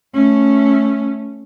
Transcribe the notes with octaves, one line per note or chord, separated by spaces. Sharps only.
A3 C#4